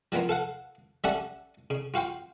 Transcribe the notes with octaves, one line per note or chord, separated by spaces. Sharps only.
F3 F#3 A#3 B3 F4
A4 F5 F#5
G3 A3 C#4 A4 D5 F#5
C#3
F4 F#4 F5 G5 C6